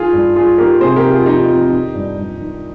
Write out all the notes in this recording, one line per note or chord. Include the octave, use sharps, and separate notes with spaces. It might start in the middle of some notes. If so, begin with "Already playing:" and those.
Already playing: D#3 F4 G#4
G2
G2 F4 G#4
D#3 G4 A#4
C3 G#4 C5
G4 A#4
D#3
F4 G#4
F2 D#4 G4
F2
D#3
G2
G2
D#3